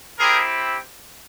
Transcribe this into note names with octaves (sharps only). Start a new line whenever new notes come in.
C4 E4 G4 G#4 A#4